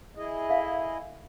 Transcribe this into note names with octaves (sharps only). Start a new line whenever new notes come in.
E4 G#4 D#5
A4 E5 F5